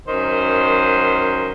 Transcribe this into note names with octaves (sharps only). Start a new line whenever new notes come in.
F#2 D#3 C5